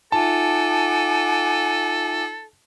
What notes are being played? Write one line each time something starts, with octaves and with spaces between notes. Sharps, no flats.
D#4 F4 A4 E5 F#5 G#5 A5 D6